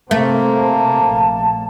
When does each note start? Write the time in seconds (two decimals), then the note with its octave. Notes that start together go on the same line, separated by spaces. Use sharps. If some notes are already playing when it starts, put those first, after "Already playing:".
0.11 C3 A3 A#3 C4
0.58 A5
1.04 A#1